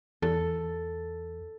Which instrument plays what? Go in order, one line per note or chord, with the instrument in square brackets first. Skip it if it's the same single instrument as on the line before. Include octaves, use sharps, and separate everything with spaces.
[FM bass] E2 [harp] A4